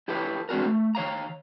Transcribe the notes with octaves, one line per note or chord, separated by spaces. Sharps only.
E4 G4 A4 B4 C#5
G#3 C4 D4 F#4 A#4
A3
D#3 C#5 F5 A#5